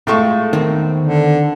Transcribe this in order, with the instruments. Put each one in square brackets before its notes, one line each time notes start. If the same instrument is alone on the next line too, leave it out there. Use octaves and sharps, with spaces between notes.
[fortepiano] A2 C#6 [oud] G#3 F4 A4
[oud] E2 B3 C4 [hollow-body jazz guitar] D#3
[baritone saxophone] D3